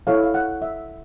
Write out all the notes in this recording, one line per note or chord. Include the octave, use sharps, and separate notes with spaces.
E4 A4 C#5 F5
F5
F#5
E5